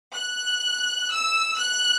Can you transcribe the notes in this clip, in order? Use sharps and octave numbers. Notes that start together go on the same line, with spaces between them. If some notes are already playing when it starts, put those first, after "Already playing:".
F#6
E6
F#6